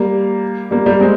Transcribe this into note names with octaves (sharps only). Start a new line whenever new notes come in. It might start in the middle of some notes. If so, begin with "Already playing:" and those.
Already playing: G3 A#3
G3 A#3
G3 A#3
G#3 C4